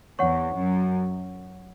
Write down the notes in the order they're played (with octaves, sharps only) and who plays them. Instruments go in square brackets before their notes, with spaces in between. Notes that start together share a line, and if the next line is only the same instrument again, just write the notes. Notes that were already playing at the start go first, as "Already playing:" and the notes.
[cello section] E2 [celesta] C#5 F#5 C#6
[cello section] F#2